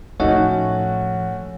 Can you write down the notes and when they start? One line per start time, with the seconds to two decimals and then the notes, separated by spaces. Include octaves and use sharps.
0.20 A2 F3 A3 C#4 D#4 F#4 C#5 F#5